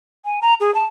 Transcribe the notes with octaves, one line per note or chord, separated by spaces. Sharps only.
G#5
A#5
G#4
A5